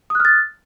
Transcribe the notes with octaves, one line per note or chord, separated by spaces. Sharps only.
D#6 F6 F#6 A6